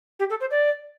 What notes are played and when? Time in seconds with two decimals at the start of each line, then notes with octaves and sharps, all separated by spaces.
0.19 G4
0.30 A4
0.40 C5
0.51 D5